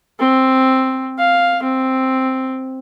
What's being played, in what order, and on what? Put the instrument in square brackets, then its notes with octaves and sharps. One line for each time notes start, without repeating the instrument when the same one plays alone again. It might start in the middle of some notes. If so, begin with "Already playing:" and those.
[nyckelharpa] C4
F5
C4